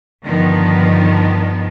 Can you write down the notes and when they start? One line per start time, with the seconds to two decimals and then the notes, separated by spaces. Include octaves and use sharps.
0.23 G2 D3 D#3 F3 B3